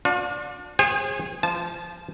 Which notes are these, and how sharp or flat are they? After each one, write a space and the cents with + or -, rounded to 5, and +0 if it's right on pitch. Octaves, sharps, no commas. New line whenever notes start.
D4 +0 F4 +45
G#4 -15 C5 +45 G#5 -45
F3 -20 A5 -25